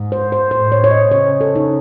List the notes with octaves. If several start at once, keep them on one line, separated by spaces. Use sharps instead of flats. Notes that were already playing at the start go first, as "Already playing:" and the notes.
Already playing: G#2
C5
C5
A2 C5
C#5
C#5
D#5
C#3 C#5
A4
D#4